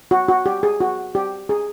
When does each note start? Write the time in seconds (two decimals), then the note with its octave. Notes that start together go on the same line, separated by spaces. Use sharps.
0.11 F#4
0.28 F#4
0.46 G4
0.63 G#4
0.80 F#4
1.15 G4
1.49 G#4